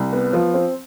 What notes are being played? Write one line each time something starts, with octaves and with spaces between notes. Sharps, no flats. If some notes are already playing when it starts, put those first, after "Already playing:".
Already playing: C2
B3
F3
C4